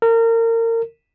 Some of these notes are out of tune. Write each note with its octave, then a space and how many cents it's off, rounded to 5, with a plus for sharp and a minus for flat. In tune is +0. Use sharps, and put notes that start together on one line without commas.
A#4 -30